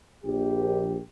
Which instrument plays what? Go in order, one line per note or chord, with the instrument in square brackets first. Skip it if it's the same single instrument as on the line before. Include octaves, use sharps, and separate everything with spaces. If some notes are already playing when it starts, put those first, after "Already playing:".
[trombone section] A#1 G4